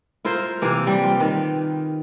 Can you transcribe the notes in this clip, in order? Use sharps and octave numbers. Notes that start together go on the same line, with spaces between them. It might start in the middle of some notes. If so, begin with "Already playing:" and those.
E4 F4 A#4 C5
C3 E3 A#3
G3
F4
D#3 B4